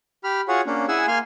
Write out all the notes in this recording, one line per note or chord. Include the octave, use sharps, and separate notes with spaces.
G4 B5 F6
F4 F#4 G#4 C#5 F#5
A#3 C#4 D4
E4 G#4 F#5 G#5 E6
A#3 F5 G#5 C6 F6